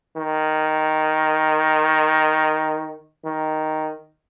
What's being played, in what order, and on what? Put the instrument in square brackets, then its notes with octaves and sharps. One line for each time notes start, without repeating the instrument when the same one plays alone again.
[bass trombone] D#3
D#3